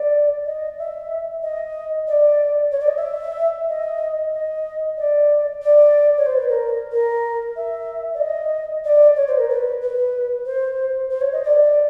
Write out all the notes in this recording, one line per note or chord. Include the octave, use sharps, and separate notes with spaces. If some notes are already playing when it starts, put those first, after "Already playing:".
Already playing: D5
D#5
E5
D#5
D5
C#5
D5
D#5
E5
D#5
D#5
D5
D5
C#5
C5
B4
A#4
A#4
E5
D5
D#5
D5
C#5
C5
A#4
B4
B4
C5
C5
C#5
D#5
D5